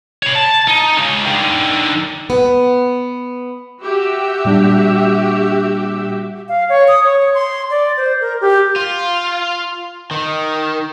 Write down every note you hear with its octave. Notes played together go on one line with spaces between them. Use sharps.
C#5 B5
A5
D#4
C#3 G#3
D3 D#3
B3
F#4 G4 E5
A#2 G3 D4
F5
C#5
D#6
C#5
C6
D5
C5
A#4
G4
F4
D#3